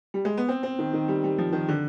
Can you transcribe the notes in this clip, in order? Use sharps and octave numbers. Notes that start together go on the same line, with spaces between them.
G3
G#3
B3
C4
C4
D#3
D#3
G3
G3
F3
D#3
D3